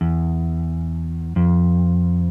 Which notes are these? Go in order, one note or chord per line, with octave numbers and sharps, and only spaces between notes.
E2
F2